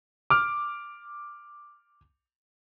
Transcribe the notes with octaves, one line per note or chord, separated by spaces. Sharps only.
D6 F6